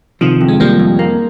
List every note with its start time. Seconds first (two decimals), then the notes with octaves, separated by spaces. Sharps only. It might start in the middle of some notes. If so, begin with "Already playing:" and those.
0.21 C3 D#3 F3
0.41 F2
0.48 G#3
0.60 F3 G3 A#3
0.80 F2
0.99 A#3